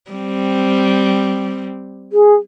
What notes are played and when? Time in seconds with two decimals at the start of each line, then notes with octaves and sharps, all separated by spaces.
0.11 G3 C4
2.13 G#4